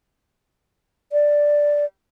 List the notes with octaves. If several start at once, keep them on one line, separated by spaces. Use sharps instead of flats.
D5